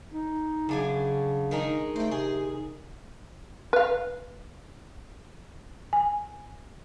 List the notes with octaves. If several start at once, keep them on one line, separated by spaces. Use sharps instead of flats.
D#4
F#2 C#3 D4 G#5
D#3 G#3 D#4
A3 C5 G5
C3 G#4
B4 F5
G#5